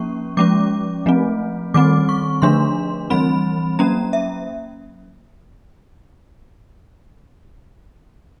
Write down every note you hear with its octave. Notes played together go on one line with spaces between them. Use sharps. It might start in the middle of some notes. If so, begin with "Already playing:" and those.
Already playing: F3 A#3 C#4 C#6
F3 G#3 C#4 D6
F3 A3 C4
D#3 G3 C4 D6
C#6
D3 F3 A3 D4 C6
E3 G3 C4 B5
F#3 A#3 C#4 A#5
E5